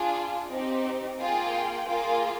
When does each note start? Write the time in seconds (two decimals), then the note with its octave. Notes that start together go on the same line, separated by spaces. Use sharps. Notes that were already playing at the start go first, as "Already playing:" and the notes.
Already playing: D4 F4 G#4
0.50 C4 D#4 G4
1.19 A#3 F4 G#4 G5
1.88 A#3 F4 G#4